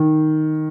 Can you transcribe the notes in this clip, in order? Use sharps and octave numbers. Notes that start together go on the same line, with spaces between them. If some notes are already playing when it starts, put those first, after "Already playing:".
Already playing: D#3